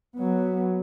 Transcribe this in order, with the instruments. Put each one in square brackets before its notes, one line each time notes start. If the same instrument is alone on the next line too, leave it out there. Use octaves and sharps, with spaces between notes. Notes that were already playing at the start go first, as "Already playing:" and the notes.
[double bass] F#3 B3